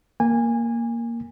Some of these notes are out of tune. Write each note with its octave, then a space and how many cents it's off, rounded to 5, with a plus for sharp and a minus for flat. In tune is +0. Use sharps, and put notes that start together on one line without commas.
A#3 +0 G#5 -20